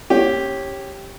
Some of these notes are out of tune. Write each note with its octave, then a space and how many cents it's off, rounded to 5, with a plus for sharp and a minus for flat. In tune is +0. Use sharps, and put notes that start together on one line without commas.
C#4 -20 G4 +0